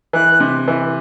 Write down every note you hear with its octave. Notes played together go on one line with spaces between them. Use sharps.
E3 F#6
C3
E3